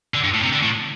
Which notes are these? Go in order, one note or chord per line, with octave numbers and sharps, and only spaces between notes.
D3
G2
A2
C3
D3
A2